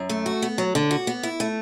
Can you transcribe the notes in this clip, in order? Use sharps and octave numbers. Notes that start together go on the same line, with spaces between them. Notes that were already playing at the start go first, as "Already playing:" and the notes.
Already playing: F#2
A3
F#4
B3
F#3
D3
F#4
B3
E4
A3